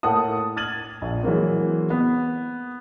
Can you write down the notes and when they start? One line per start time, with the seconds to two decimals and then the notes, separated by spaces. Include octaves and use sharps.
0.03 A2 A#3 F#5 A5 D#6
0.57 F6 G#6 A6 D#7 F#7
1.02 A#1
1.23 E3 F#3 G#3 A#3 C4
1.90 B3